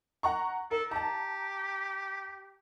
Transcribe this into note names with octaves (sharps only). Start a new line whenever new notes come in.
F#5 A#5 C#6
A4 A#4
G4 A5 A#5